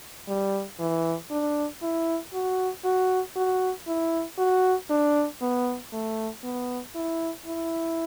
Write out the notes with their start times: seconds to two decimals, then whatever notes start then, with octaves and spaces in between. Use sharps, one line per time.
0.28 G3
0.79 E3
1.30 D4
1.82 E4
2.33 F#4
2.84 F#4
3.36 F#4
3.87 E4
4.38 F#4
4.90 D4
5.41 B3
5.93 A3
6.44 B3
6.95 E4
7.46 E4